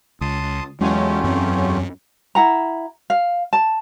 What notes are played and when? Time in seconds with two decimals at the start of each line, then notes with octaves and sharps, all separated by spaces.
0.21 C#2 A5 C6 D#6
0.81 E2 F#3 G#3 A3 C#4 F4 G4
1.24 F#2 C4
2.35 E4 F#5 A#5
3.10 F5
3.53 A5